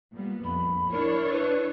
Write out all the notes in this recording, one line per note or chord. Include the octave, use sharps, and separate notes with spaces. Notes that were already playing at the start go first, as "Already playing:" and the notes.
A#2 G3 B3
A#1 F2 B5
D4 E4 A#4 C#5
B4